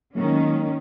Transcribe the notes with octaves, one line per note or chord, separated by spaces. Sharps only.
D#3 F#3 G#3 A#3 C#4